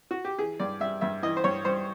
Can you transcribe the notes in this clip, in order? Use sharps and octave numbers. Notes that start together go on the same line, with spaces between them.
F#4
G4
E3 G#4
G2 D5
G3 E5
G2 E5
E3 D#5
C5
G2 C#5
G3 C5